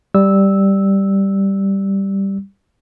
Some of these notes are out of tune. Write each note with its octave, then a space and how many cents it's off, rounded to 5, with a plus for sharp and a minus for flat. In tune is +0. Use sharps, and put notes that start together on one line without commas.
G3 +0 E6 -10